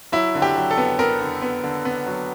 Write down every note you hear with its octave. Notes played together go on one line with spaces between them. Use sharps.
F#3 E4
D3
G4
F#3
A4
B3
B3 A#4
D3
B3
D3
B3
F#3